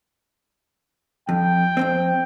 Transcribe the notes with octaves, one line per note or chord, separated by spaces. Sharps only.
F2 G5
F2 G#2 C4